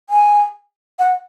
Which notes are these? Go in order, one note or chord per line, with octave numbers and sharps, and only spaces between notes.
G#5
F#5